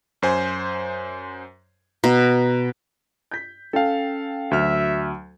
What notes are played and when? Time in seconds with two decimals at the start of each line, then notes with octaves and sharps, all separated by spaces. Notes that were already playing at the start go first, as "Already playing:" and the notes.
0.22 F#2 C5 G#5
2.04 B2 A#5
3.31 G6 B6
3.73 C#4 A4 F5 G5 A5
4.51 D2 F#3 E5 F6